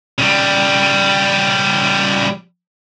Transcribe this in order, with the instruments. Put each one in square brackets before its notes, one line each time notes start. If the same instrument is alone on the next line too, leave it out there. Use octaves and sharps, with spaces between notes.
[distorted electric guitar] C#3 G3